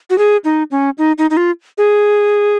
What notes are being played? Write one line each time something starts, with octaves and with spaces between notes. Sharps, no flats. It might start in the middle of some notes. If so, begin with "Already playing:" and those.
F#4
G#4
D#4
C#4
D#4
D#4
D#4
F4
G#4